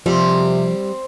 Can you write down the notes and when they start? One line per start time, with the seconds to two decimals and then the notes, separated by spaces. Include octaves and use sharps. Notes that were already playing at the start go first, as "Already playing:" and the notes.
0.06 C3 F3 G3 C4